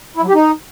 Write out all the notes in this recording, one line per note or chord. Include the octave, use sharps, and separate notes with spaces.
E4
F#3
G4
D#4